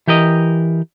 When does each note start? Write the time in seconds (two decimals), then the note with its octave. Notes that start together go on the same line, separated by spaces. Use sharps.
0.07 E3 G4 A#4 D#5